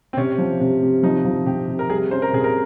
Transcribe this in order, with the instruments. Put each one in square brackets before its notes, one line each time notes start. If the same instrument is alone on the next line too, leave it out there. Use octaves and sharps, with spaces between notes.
[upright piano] C4
[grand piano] C3 [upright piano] C#4
[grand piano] F3
C3
C3
[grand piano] F3 [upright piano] D#4
[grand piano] F3
[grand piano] C3 [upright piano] G4
[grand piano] C3
[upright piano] A#4
[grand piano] G3 [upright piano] G#4
[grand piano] C#4 [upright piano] C5
[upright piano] A#4
[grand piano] C3 [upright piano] G#4
[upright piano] A#4